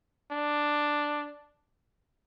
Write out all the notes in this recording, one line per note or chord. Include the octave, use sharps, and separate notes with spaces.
D4